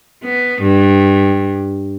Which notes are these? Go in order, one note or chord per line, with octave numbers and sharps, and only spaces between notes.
B3
G2